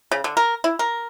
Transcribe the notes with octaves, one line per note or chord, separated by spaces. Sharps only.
C#3
D3
A#4
E4
A#4